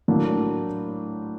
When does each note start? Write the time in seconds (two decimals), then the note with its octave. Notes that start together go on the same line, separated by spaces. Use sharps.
0.08 A2 F#3 A#3 D4